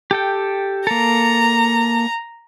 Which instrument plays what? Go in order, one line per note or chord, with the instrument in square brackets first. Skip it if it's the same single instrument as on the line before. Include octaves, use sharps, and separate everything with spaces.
[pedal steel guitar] G4 A4 G5
[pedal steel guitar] A#3 A4 [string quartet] A#5